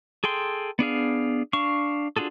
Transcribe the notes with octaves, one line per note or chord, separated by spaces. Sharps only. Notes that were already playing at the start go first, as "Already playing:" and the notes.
G#4 A4 G5 C6
B3 D4 G#4 F5
D4 F5 C#6
D4 F4 F#4 G#4 A4